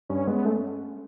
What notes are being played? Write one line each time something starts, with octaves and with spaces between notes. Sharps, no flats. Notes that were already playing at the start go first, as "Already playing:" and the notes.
G2 C#4
G#3 B3
A3 C#4